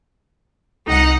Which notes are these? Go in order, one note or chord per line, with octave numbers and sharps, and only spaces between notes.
C2 D#4 F#5 C#7